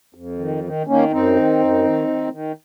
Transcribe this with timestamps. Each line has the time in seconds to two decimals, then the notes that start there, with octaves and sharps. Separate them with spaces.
0.14 F2
0.39 D#3
0.64 D#3
0.87 D#3 A#3 C#4
1.11 F#2 C4 D#4
1.36 D#3
1.59 F#2
1.84 D#3
2.07 D#3
2.31 D#3